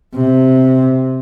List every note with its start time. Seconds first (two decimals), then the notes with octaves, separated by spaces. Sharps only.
0.15 C3